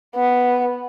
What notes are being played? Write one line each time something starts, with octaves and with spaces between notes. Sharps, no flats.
B3